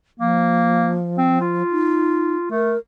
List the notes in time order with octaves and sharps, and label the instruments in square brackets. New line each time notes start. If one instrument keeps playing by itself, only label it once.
[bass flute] F3 [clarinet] A#3
[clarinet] C4
F4
[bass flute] D#4
[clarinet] A3 [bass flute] A#4